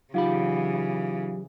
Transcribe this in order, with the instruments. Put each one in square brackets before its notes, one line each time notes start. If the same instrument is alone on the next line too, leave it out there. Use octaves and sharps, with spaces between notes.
[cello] C#3 E3 [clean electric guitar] F#3 G4 B5 [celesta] D#4 F4 F5